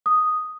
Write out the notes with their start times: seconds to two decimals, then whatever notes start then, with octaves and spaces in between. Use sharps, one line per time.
0.06 D#6